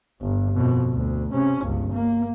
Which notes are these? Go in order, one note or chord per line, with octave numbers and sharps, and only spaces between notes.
G1
F2 B2
D2
C3 C#4
G1 C#2
A#3